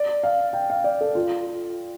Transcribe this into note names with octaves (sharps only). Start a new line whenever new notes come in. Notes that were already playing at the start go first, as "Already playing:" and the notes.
Already playing: D5
F5
G5
F5
D5
A4
F4